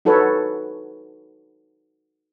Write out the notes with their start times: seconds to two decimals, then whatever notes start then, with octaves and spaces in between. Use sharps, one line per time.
0.05 D#4 F#4 A4 B4 C#5